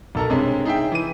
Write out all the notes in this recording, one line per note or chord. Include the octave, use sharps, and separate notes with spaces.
B1 A4 A#4
G2 C3 G#3 C#4
D#4 G#4 E5 G5
E3 D#7